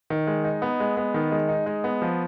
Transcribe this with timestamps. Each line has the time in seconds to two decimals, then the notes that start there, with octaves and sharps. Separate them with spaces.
0.10 D#3
0.27 G#3
0.44 D#4
0.62 B3
0.80 G#3
0.97 B3
1.14 D#3
1.32 G#3
1.49 D#4
1.66 G#3
1.84 B3
2.02 F3